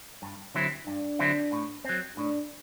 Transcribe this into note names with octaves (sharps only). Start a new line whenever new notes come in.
G2
D3 F#3 C4 E4
G2 D4
D3 F#3 C4 E4
A2
F#3 C4
A2 D4